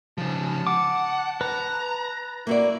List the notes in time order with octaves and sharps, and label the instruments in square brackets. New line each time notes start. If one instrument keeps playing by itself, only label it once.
[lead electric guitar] C#3 F3 [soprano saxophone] A5
[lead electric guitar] F#5 [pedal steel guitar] D6
[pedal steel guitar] B4 [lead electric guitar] A#5
[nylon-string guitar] A#3 F#4 D5 [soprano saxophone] E4